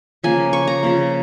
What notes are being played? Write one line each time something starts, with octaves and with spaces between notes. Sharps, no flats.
C#3 F3 A#3 G#5
C#6
A#5
C#3 F3 A#3